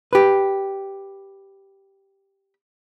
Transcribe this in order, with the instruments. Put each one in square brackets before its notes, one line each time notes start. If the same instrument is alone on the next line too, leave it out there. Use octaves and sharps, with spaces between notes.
[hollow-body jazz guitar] G4 B4